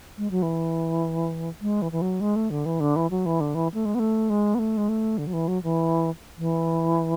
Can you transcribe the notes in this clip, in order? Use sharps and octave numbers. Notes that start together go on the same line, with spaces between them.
G#3
F#3
E3
G#3
E3
E3
F#3
G#3
A3
D3
E3
D3
E3
F#3
E3
D3
E3
A3
G#3
B3
A3
G#3
B3
A3
G#3
A3
D3
F#3
E3
F#3
E3
E3